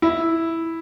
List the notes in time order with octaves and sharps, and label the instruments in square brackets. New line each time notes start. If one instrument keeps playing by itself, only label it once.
[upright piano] E4